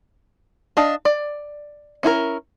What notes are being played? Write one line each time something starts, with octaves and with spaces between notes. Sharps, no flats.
D4 D#5 F5 A5
D5
C#4 E4 F4 A#4